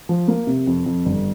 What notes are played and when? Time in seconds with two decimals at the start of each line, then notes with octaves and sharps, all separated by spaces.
0.09 F3
0.28 A#3
0.47 C3
0.67 F2
0.86 F2
1.05 G1